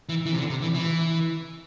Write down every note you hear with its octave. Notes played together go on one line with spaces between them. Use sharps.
E3
E3
C3
D3
C3
E3
E3